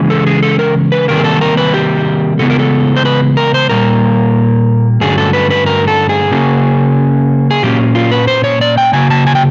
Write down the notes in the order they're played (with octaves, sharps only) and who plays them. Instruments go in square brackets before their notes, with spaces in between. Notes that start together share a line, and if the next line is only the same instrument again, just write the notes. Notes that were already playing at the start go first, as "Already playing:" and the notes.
Already playing: [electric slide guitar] C#3 E3 G#3 C#4
A4
G#4
A4
A#4
B4
C3 D#3 G3 A#3 A#4
G#4
A4
A#4
B4
G4
C#3 E3 G#3 B3 A4
A#4
A4
C5
B4
A#4
C5
A#2 G3 A#3 A#4
G2 D3 F#3 A3 C#4 G#4
A4
B4
B4
A#4
A4
G#4
C#3 F#3 A#3 C#4
G#4
A#2 F#3 A#3 C#4 G4
F4
B4
C5
C#5
D5
G5
C#3 F#3 A#3 G#5
A5
G#5
G5